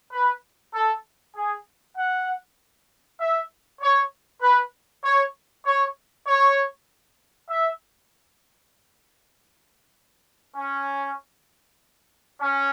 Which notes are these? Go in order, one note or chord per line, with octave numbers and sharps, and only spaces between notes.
B4
A4
G#4
F#5
E5
C#5
B4
C#5
C#5
C#5
E5
C#4
C#4